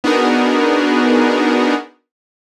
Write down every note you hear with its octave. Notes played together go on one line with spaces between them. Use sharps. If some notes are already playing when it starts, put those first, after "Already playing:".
B3 D4 D#4 F#4 G#4 A#4